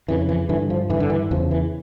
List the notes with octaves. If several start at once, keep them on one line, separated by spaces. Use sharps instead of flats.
F2 C#3 E3
E3
G2 D3 E3
F3
G2 D3 E3
D3
E3
E2 C#3 F3
E3